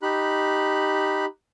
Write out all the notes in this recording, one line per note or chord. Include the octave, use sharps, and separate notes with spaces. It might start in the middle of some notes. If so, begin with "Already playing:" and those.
D#4 G4 B5 F#6